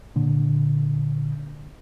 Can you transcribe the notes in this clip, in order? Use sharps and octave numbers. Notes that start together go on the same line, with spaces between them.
A#2 D3